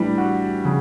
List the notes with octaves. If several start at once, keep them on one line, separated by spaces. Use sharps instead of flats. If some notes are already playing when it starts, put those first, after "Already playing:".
Already playing: A2 E3 G3 D4
F#4
C#3